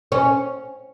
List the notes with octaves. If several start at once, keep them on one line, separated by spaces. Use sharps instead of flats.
C#4